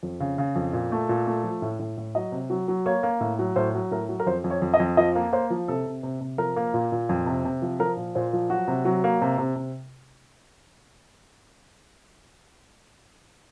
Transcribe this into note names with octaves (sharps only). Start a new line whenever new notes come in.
F2
C#3
C#3
F2
A#2
A3
A#2
A3
F3
A2
A2
A2
F#3 D#5
C3
F#3
F#3
A#3 C#5
A#3
A2
F#3
A2 C5
F#3
A2 A#4
F#3
A#4
F2 C5
F2
C#5
F2
D#5
F2
F3 D#5
A#3
A#3 C5
F3
C3 A4
C3
C3
C3
F3 A#4
A#3
A#2
A#2
F2
C3
C3
F3
F3 A#4
A#2
A#2 C5
F3
F#3 F#4
C3
F#3
A#3
C3
C3
C3